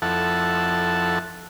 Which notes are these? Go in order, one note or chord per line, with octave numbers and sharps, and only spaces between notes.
F2 E4 A4 F#5 A5